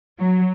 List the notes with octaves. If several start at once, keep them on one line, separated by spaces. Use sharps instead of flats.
F#3